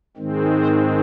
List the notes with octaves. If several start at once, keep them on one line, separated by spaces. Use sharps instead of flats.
G#2 D#3 G#3 C4
C5